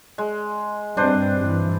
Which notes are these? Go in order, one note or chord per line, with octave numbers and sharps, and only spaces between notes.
G#3
G2 G3 C4 D4 B4 C5
G2 E3